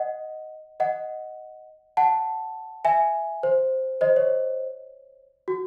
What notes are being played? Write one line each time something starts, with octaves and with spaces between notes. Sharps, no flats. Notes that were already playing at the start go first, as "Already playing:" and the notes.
Already playing: D#5 F#5
D#5 F#5
F#5 A5
E5 G#5
C5
C5 D#5
C#5
F#4